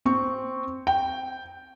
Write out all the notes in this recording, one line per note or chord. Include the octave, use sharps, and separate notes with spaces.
C4 C#6
G5